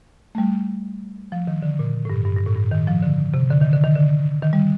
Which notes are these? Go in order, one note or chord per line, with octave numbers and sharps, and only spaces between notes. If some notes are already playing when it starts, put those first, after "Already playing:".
A3
G3
F3
D#3
D3
A#2
A2
G2
G2
G2
A2
G2
D#3
F3
D3
C3
D3
D#3
D3
D#3
D3
D#3
G3